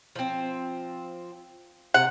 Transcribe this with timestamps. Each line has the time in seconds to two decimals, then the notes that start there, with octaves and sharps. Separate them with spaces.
0.16 F3 C4
1.94 C3 F#5